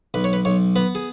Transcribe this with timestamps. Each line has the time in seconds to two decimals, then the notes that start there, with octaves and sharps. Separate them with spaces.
0.14 B1 B4
0.24 C#5
0.33 B4
0.45 B1 C#5
0.76 B3 B4
0.95 G#4